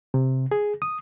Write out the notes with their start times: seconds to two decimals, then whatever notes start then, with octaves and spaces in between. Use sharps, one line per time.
0.14 C3
0.51 G#4
0.82 D#6